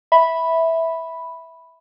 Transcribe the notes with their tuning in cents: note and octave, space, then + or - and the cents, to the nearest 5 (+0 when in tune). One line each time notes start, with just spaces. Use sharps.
E5 -10 B5 +0